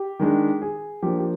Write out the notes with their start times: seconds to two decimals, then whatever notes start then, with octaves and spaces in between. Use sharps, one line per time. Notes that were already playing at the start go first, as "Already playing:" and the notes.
Already playing: G4
0.19 D#3 G#3 D4
0.62 G#4
1.02 F3 A#3 D4 G4
1.19 G4